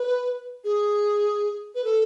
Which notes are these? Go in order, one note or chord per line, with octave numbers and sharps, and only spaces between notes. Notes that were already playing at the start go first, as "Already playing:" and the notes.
Already playing: B4
G#4
B4
A4